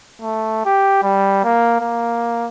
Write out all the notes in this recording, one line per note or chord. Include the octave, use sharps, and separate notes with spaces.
A3
G4
G3
A#3
A#3